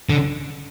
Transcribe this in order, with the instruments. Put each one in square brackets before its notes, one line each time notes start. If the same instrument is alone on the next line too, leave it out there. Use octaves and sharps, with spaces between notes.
[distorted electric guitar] D3